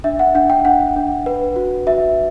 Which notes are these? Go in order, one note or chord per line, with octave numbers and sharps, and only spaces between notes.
D4 E5
F#5
D4 F#5
G5
D4 F#5
D4
B4
F#4
F#4 E5